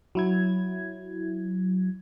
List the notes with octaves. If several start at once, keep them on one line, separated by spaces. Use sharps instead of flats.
F#3 E4 G#6